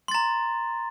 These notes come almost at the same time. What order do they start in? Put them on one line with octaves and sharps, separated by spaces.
C6 A6 A#5